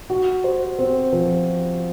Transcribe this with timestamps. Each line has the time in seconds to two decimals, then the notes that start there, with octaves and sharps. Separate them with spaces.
0.10 F#4
0.44 C5
0.79 C4
1.13 F3